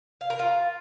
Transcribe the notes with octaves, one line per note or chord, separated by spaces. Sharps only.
F5
A#4
F4